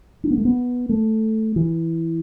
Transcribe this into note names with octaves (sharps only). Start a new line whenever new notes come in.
D4
B3
A3
B3
A3
E3